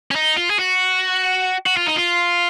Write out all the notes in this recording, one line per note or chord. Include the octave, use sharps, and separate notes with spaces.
C#4
D#4
F4
G#4
F#4
F#4
F4
D#4
F4